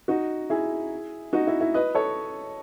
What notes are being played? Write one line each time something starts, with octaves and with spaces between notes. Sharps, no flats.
D#4 F#4
E4 G#4
D#4 F#4
E4
E4
B4 D#5
A4 C#5